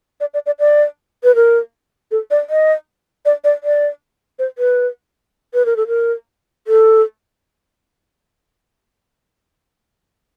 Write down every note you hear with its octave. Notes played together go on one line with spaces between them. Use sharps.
D5
D5
D5
D5
B4
A#4
A4
D5
D#5
D5
D5
D5
C5
B4
B4
A#4
A4
A#4
A4